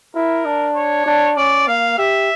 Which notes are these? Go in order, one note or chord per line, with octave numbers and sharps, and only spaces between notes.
E4 A#4
D4
C#5
D4
C#4 D5
A#3 F5
G4 E5